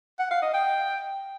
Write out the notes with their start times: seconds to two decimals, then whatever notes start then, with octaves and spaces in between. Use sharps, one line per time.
0.19 F#5
0.31 F5
0.42 D#5
0.54 G5